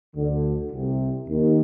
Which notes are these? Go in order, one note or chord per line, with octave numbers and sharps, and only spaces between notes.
D2 D3
C2 C3
D#2 D#3